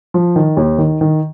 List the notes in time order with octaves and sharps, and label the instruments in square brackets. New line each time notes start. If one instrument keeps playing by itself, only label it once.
[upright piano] F3
D#3
D#2
D#3
D#3